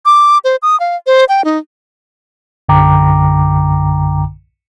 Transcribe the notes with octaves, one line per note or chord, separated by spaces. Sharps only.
D6
C5
D#6
F5
C5
G5
D#4
A#1 F#2 D3 G5 A#5 D6